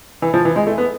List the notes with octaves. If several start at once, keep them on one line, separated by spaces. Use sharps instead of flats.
E3
F3
E3
G#3
A3
B3